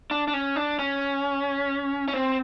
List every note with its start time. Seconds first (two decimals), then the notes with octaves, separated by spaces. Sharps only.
0.11 D4
0.28 D4
0.34 C#4
0.56 D4
0.79 C#4
2.08 C#4
2.14 C4